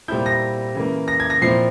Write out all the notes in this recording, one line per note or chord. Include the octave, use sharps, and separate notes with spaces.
A#2 G3 C4 E4 G6
A#6
C#3 E3 A#3
A#6
G#6
A#6
A#2 F3 C4 E4 C7